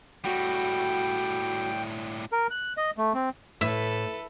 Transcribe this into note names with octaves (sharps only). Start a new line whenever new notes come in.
A2 G3 F#4 G5
A#4
F#6
D#5
A3
C4
A2 A4 B4 E5